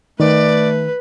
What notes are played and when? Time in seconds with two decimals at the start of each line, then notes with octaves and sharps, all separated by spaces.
0.20 D#3 A3 B4 D5